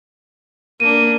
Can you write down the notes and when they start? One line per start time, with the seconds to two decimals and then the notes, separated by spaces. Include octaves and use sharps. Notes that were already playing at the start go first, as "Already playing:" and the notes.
0.80 A#3 D4 D#7